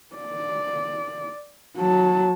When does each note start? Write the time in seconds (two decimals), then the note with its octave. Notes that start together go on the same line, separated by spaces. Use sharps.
0.16 D5
1.77 F#3 A5